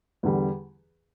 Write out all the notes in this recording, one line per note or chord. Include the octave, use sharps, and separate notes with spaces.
E2 D3 G3